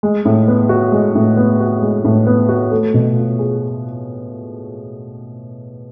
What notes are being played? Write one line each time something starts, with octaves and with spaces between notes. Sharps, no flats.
G#3
A2
B3
F#4
G#3
A2
B3
F#4
G#3
A2
B3
F#4
A3
B2
F4
G#4